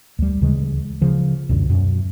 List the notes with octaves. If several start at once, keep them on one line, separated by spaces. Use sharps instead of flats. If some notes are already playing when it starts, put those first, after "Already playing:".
D2 G3
D2 C#3 E3 G#3
C#3 F3
C#2 F#2 B2 D3
F#2 B2